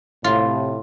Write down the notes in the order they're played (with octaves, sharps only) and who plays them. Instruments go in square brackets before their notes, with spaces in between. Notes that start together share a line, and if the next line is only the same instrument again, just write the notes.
[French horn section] A2 C3 [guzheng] F4